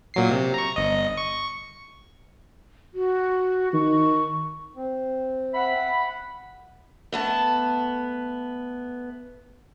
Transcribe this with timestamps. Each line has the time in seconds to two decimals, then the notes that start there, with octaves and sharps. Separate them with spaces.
0.14 A#2 F#3 C7
0.31 C3
0.54 A#5 C#6
0.76 G1 D#5
1.17 C#6
2.94 F#4
3.74 D#3 C#6
4.76 C4
5.54 E5 F#5 B5
7.12 A3 B3 A5